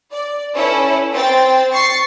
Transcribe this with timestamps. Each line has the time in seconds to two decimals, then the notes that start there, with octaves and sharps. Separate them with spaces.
0.12 D5
0.55 C#4 E4 A4 B4
1.13 C4 C5 G5 A6
1.72 C#6 A6 C7